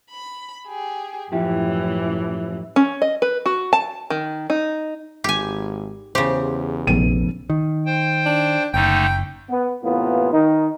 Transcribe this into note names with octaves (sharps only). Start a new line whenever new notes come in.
B5
G4 G#4
F#2 A2 E3 F3 E4 G4
C#4
D#5
B4
F#4
A5
D#3
D#4
G#1 G4 G#5
E2 C#3 G4 C5
F1 A#1 B3 D#7
D#3
C5 G5
D4
F#1 D3 A3 D#4 G5
B3
A2 C3 E3 A#3 B3 F4
D#3 D#4